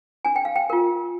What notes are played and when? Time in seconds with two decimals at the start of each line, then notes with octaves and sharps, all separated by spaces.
0.25 D4 G#5
0.36 G5
0.45 F5
0.56 G5
0.70 F4 A#4